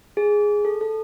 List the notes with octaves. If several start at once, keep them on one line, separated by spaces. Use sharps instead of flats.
G#4
A4
A4